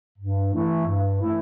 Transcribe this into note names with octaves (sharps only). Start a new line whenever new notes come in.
G2
E3 A3 E4
G2
E3 A3 E4